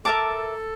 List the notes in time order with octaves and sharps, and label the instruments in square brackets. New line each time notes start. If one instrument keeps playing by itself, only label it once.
[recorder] A4 [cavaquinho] A#4 E5 A5 D6